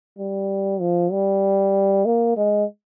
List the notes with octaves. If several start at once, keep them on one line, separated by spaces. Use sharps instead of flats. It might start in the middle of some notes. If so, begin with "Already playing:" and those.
G3
F3
G3
A#3
G#3